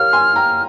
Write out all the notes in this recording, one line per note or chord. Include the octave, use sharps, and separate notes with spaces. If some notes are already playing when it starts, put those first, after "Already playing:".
Already playing: G4 A#4 C#5 F5 F6
G#5 C6
G5 A#5